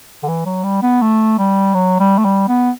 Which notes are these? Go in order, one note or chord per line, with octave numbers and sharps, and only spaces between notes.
D3
E3
F#3
G3
B3
A3
G3
F#3
G3
A3
G3
B3